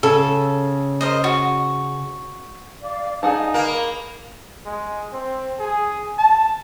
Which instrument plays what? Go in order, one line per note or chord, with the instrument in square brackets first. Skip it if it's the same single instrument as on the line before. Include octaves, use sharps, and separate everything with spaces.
[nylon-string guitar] C#3 [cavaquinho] A4
[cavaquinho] A#4 C5 D#5
F#4
[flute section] D5 F5 D6
[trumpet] D#4 [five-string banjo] G#4 F#5 A5 [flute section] D5 F5
[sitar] A#3 [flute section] B5
[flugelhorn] G#3
C4
G#4
A5